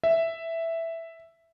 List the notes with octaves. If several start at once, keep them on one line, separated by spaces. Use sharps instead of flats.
E5